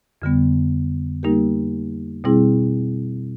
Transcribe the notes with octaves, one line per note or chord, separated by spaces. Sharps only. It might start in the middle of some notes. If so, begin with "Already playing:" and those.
F2 D3 G3 B3
G3 A#3 D#4 G4 A#4
B2 G3 C4 E4 G#4